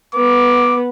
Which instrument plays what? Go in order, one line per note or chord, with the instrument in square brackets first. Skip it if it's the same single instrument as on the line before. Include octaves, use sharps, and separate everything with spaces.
[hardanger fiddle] B3 [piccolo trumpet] D6